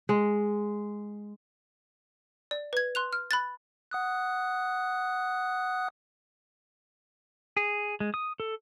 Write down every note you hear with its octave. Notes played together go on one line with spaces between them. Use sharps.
G#3
D5
B4 G#6
C6 F#6 F7
F6
B5 F#6 A6
F#5 D#6 F#6
G#4
G#3
D#6
A4